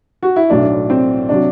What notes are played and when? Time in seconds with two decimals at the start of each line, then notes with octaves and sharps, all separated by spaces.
0.23 F#4
0.36 E4
0.50 B1 A2 F#3 D4
0.90 C4
1.29 C3 F#3 D4